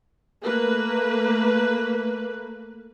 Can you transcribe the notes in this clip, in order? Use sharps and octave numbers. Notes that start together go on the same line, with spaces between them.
A3 A#3 B4